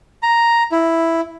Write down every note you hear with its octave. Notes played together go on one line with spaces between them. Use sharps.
A#5
E4